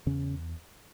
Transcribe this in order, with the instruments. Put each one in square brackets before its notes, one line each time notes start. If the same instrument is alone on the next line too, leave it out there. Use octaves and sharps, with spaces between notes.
[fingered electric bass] E2 C#3 C#4